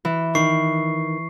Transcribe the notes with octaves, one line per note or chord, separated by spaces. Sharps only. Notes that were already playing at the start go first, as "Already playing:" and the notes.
E3
D#3 C#6 C7